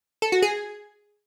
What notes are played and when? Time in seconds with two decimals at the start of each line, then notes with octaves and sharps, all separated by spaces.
0.22 A4
0.32 F#4
0.42 G#4